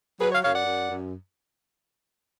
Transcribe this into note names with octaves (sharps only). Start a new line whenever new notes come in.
F#3 G#4 B4
C#5 F5
F#2 C#5 F5
D5 F#5
F#2
F#2